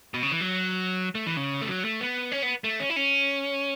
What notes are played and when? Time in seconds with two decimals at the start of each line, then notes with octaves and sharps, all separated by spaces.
0.14 B2
0.23 C#3
0.32 E3
0.41 F#3
1.15 A3
1.26 E3
1.37 C#3
1.61 A3
1.69 F#3
1.85 A3
2.00 B3
2.32 C#4
2.42 B3
2.64 A3
2.80 C#4
2.90 E4
2.96 C#4